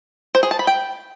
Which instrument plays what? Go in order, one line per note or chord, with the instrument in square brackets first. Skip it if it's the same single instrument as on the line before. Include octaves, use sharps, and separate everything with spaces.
[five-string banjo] C5
G#4
A5
B5
G5